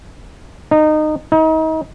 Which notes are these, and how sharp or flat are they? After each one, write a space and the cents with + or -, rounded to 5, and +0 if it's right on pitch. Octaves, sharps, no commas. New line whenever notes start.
D#4 -20
D#4 +35